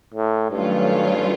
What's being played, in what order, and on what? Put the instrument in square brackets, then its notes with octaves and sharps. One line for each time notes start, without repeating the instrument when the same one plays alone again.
[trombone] A2
[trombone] G2 [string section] D#3 F#3 A3 C#4 F4